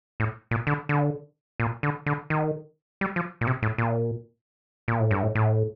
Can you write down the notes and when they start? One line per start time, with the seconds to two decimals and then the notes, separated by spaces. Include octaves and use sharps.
0.20 A2
0.51 A#2
0.67 D3
0.89 D3
1.60 A#2
1.83 D3
2.06 D3
2.30 D#3
3.01 G3
3.16 F3
3.41 A#2
3.47 C3
3.63 A2
3.78 A#2
4.88 A#2
5.00 A2
5.11 G2
5.23 A2
5.35 A2